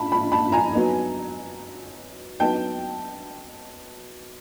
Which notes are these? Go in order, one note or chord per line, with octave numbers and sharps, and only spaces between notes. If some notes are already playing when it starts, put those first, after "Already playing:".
Already playing: A5 B5
A5 B5
A5 B5
G#5 A#5
F#3 B3 D#4
F#3 B3 D#4 G5 A5